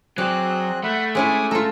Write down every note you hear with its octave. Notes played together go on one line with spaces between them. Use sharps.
F#3 C4 G#4 D5 F#6
A3 E5 F#5 B5
G#3 C#4 E4 G#5 D6 D#6
F4 A4 A#5 E6